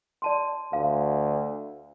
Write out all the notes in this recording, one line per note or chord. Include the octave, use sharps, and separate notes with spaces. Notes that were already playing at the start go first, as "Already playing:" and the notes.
D5 A5 C6
D2 F5